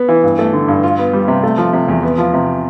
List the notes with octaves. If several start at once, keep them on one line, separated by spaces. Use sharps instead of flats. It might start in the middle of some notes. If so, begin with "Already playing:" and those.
Already playing: B3
E3
G2
A3
D3
G2
F4
B3
G3
C3
A3
F3
C3
E2
B3
F3
C3